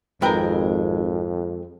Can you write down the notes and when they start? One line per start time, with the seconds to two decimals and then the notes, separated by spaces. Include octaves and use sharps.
0.22 G#1 F2 G#3 C4 A#4 B4 G5